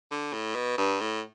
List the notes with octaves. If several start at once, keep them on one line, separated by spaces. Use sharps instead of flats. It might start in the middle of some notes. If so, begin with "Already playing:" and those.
D3
A2
B2
G2
A2